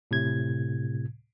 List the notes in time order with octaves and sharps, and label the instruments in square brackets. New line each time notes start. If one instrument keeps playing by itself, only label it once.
[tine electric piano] A2 C3 G#6